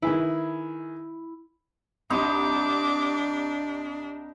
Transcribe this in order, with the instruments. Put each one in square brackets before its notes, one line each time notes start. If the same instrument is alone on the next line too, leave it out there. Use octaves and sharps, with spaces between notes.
[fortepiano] D#3 G#4 B4 [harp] E4
[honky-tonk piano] C2 D#6 [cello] D4 [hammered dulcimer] D#4 B5 C6 [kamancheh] D6